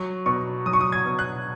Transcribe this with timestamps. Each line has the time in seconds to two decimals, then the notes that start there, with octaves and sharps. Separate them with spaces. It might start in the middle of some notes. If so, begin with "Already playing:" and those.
Already playing: F#3 C#6
0.26 B2 C#6
0.66 F#3 D#6
0.73 C#6
0.81 D#6
0.92 G#6
1.05 B2
1.19 F#6